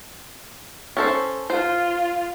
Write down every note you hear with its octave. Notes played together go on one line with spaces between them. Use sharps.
C#4 A4 C5
F4 C5